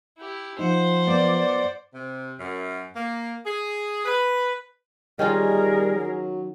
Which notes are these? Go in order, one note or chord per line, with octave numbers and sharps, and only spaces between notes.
E4 G4
F3 D#4 C5 F#5
F#2 B3 F4 D5
C3
F#2
A#3
G#4
B4
D#3 G3 C#4 F4 G#4 A#4
F#3